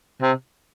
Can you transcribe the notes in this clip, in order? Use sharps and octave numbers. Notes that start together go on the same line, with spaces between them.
C3